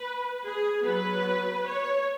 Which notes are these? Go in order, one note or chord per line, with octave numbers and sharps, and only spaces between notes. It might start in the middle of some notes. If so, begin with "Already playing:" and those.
Already playing: B4
G#4
F#3 B3 B4
C#5